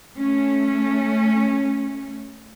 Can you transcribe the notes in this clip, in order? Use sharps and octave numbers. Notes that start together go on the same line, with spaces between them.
A3 C#4